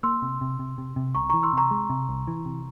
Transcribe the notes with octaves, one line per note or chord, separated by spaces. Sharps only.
A#3 C6 E6
C3
C3
C3
C3
C3
C2 A#5 C#6
A#5 C#6
E3
C6 E6
C3 A#5 C#6
G#3
C3
C2
E3
C3